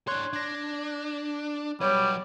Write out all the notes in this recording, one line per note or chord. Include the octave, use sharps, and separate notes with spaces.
D4 C#5 C6 F#6 G#6
D4 G#6 A#6
F#3 G3 B4 C#5 D7